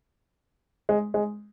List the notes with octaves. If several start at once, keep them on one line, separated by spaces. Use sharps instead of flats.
G#3
G#3